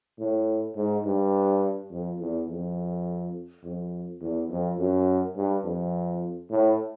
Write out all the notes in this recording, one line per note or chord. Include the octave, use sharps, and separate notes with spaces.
A2
G#2
G2
F2
E2
F2
F2
E2
F2
F#2
G2
F2
A2